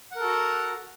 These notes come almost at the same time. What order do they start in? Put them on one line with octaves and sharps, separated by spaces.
F#5 A#4 A4 F#4 A#5